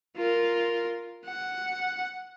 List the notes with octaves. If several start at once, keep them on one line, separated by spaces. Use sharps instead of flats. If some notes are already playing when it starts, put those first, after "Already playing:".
F4 A#4
F#5